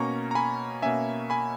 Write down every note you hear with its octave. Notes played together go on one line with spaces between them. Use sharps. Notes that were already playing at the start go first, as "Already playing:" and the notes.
Already playing: B2 A#3 C#4 A#5 C#6
A#5
G#5 B5
B2 A#3 C#4 E5 G#5
G#5 B5